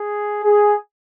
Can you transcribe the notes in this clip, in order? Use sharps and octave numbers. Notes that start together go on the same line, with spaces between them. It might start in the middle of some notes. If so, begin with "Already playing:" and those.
Already playing: G#4
G#4